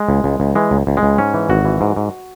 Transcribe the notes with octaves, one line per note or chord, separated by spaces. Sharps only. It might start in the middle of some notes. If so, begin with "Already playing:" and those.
Already playing: G#3
C#2
C#2
C#2
E3 G#3
C#2
C#2
G#3
C#2
G#2 C#4
E3
G#1 F#4
E3
G#2
G#2